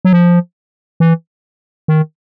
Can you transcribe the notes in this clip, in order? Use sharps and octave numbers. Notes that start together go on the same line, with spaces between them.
F#3
F3
E3
D#3